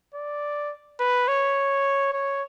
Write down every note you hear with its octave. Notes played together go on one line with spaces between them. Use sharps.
D5
B4
C#5
C#5